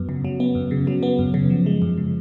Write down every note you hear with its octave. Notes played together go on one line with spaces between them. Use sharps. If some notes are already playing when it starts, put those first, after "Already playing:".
Already playing: F#2 F#3 B3
C#3
F#3
B3
F#2
C#3
F#3
B3
F#2
C#3
F3
G#3
F#2
C#3